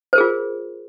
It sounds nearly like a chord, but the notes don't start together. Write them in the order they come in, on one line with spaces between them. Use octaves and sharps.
C5 A#4 G#4 F4